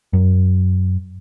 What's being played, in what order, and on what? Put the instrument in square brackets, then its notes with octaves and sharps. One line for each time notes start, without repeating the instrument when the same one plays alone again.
[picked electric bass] F#2